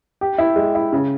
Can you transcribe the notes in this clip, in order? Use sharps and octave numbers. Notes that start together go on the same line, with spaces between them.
G4
E4
G#3
E4
C#3